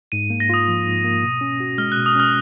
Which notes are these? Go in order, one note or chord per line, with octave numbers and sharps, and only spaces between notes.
G#2 D#7
A#3
A#6
F4 D#6
F3
G#2
A#3
B2
C#4
F#4
G#3 F6
F#6
B2
D#6
C#4 F6